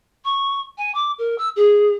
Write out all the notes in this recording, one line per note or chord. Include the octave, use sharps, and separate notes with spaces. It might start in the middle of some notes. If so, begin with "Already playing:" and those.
C#6
G#5
D6
A#4
E6
G#4